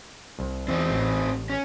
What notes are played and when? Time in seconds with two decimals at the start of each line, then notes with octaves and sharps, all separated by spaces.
0.39 C2
0.68 E2 C4 D#4
0.90 A1
1.50 C#4